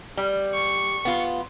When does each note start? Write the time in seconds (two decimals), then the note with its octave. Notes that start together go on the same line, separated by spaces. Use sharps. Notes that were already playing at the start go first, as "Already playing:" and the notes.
0.17 G3
0.54 C#6
1.05 B3 F4